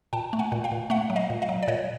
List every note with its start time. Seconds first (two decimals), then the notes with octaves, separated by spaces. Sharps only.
0.13 A#2 G5 A5
0.33 A3
0.39 F#5 G#5
0.52 A#2
0.64 F5 G5
0.72 A#2
0.90 A3 E5 F#5
1.10 F#3
1.16 D#5 F5
1.30 A#2
1.42 D#5 F5
1.49 F#3
1.63 D5
1.68 A#2 C#5 D#5